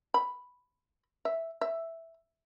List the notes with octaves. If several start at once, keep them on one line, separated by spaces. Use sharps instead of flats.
B5
E5
E5